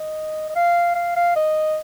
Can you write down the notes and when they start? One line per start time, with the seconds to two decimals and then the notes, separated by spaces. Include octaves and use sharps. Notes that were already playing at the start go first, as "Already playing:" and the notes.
Already playing: D#5
0.49 D#5
0.55 F5
0.95 F5
1.16 F5
1.36 D#5